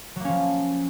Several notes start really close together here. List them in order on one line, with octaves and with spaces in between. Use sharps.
F#3 A#3 C#4 F3